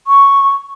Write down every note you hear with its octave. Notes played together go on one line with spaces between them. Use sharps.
C#6